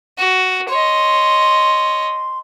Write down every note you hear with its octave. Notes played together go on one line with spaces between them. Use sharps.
F#4
C#5 D#5 C6